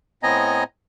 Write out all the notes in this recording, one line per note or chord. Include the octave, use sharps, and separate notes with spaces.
A2 B3 C4 D#5 G#5 A#5